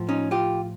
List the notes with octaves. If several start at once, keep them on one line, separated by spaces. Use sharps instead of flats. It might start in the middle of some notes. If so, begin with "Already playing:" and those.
Already playing: A2 F3
C#4 D#4
F4 G4